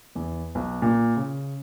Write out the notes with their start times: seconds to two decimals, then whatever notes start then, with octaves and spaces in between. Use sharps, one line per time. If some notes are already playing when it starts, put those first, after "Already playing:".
0.15 E2
0.55 B1
0.82 A#2
1.16 C#3